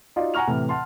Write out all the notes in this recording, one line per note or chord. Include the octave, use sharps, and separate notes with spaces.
D#4 F4 F#4 D5 F5
F#5 G#5 A#5 C#6 F6 F7
A2 C3 E3
F#5 A5 C6